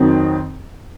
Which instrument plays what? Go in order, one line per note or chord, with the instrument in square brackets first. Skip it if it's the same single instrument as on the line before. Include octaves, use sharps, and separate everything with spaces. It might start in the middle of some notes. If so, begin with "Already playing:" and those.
Already playing: [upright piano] F2 D#3 F#3 C4